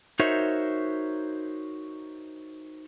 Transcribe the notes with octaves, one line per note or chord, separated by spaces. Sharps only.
D#4 F#4 A#4 C5 C#5 E5